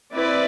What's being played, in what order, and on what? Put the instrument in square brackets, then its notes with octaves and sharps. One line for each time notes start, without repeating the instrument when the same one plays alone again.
[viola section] C4 E4 B4 D5